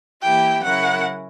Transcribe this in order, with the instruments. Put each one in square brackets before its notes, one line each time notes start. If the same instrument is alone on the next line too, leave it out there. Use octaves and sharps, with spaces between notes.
[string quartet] E3 A#3 E4 G4 [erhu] G5
[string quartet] C#3 F#3 C#4 E4 A#4 [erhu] F#5